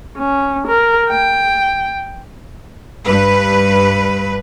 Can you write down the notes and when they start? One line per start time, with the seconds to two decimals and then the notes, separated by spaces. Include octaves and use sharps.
0.17 C#4
0.67 A#4
1.09 G5
3.04 G2 B4